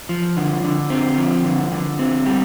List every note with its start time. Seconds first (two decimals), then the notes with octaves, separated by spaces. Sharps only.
0.09 F3
0.37 D3
0.63 D3
0.90 C4
1.17 F3
1.45 D3
1.72 D3
1.99 C4
2.26 G3